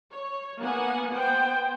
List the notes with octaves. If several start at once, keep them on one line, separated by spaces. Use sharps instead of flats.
C#5
A#3 B3 F#5 G#5
B3 C5 G5